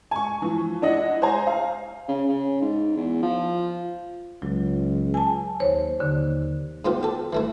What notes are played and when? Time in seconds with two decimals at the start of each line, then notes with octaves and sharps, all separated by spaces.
0.11 G#5 C#6
0.42 E3 F3
0.82 D4 E4 D#5 F#5
1.22 C5 C#5 G#5 A#5
1.47 F5
2.08 C#3
2.28 C#3
2.61 G#2
2.96 E2
3.22 F3
4.42 C#2 F#3
5.14 G#5 A5
5.60 D#2 C5 C#5
6.00 D#2 D3
6.85 G#2 B3 F4 G4
7.03 G4 A4
7.33 E3 A3 E4